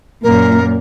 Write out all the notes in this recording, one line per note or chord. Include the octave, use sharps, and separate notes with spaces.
F#2 A#2 A#4